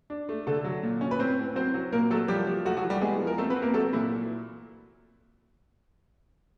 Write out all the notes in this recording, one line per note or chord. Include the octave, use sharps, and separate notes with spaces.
D4
A3
D3 A3 A4
F#3
A#2
C#4
B4
A2 C4 C5
A2
F#3 C4 C5
F#3
A#2 A#3 A#4
F#3 A3 A4
F3 G3 G4
F3
F#3 A3 F#4
F#3 F#4
E3
G3 G4
G#3 B3 G#4
F3
A#4
A3 C4 A4
B3 B4
C4
A#3 A#4
F#3 A3 A4
A#2 E3 E4